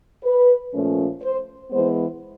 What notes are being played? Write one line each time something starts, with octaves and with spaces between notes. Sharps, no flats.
B4
A#2 F3 A3 C#4
C5
E3 G#3 B3 C5